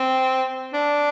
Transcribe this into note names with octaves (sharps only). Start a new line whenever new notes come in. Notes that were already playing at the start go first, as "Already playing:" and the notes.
Already playing: C4
D4